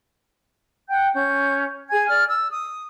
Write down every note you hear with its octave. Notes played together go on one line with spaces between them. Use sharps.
F#5 G5 G6
C#4 G6
G#4 G#5 G#6
D5 F6
E6
D#6